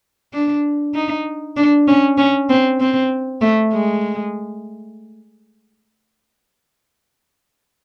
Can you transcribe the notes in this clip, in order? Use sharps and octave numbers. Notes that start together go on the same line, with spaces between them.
D4
D#4
D4
C#4
C#4
C4
C4
A3
G#3